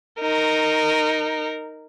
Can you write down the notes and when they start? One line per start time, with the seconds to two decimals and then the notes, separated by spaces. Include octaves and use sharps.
0.20 D#4 A#4